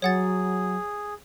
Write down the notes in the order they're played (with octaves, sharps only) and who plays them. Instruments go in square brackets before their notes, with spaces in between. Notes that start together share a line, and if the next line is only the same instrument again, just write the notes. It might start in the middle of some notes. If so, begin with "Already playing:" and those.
[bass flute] F#3 [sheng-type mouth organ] G#4 [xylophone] C#5 F#5 A6